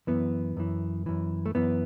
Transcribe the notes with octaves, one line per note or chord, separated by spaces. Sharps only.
F#2 E3 B3
F#2 E3
F#2 E3
A3
F#2 E3 B3